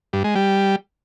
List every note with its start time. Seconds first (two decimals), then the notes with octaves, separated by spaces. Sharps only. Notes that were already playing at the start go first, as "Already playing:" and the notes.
0.13 G2
0.24 G#3
0.35 G3